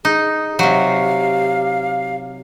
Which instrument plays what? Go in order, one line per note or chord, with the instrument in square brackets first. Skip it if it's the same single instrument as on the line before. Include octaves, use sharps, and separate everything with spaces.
[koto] D#4 [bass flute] G#4
[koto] C3 F#3 [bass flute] G4 [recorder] F5